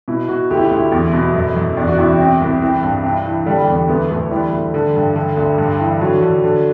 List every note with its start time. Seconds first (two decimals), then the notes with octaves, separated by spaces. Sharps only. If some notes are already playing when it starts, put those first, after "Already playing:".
0.08 B2 E4
0.28 B2 F#4
0.51 D2 G4
0.57 E4
0.64 F#4
0.71 D2
0.78 E4
0.92 E2
1.13 B2
1.35 F#2
1.56 F#2
1.77 E2 D4
1.87 F#4
1.98 E2 E4
2.09 C4
2.19 C3 C4
2.41 C2
2.62 E3 C4
2.82 G2
3.04 C3
3.26 E3
3.46 D3 G3
3.60 G3
3.67 E2
3.75 G3
3.88 D2 B3
4.10 D2 A3
4.31 E3 G3
4.53 D2
4.74 D3
4.96 G2
5.16 D3
5.37 D2
5.58 G2
5.80 E3
6.01 D3 F#3
6.21 D3
6.44 D3